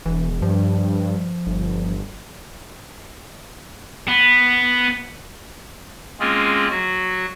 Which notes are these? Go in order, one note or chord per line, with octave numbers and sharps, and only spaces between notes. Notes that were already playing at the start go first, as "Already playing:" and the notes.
E1 E3
G2 F3
G1
B3
G#3 A#3 C4 C#4 F4 G#4
F#3 F#4